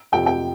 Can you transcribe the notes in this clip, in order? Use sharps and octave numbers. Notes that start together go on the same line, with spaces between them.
F2 C3 F3 G5
G5